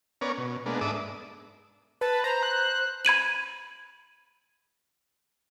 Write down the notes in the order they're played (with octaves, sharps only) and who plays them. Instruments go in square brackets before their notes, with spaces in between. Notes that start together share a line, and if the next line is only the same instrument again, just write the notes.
[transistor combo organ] B3 C#4 A#4 C#5 D5
B2
G#3 A#3 B3 D4
G#2 D4 A4 E5 D6 D#6
[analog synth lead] B4 [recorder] A5
[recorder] C5 [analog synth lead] A#5
[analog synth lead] F#6
[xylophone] B5 G#6 D#7 F#7